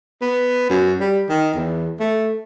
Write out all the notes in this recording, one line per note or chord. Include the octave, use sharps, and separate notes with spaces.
B3
F#2
G3
D#3
E2
A3